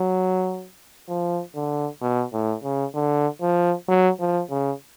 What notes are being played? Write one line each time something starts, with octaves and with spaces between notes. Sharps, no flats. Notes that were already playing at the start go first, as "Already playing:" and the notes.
Already playing: F#3
F3
D3
B2
A2
C#3
D3
F3
F#3
F3
C#3